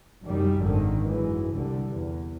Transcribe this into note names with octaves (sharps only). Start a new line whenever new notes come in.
C2 F#2 D#3 G3
G#1 D3 D#3
F#2 E3 G#3
C2 D3 G3
E2